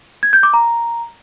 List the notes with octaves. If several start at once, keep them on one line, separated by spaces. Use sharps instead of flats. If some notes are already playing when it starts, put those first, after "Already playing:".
G#6
G6
D6
A#5